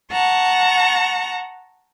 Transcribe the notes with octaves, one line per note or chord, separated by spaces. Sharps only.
F#5 A5 A#5 C#6